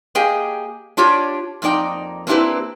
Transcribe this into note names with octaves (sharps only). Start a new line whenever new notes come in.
A#3 G4 G#4 D#5 G5
D4 F4 G4 C#5 D5
F2 A#3 D#4 D5 G5
A#3 C4 D4 E4 G4 B4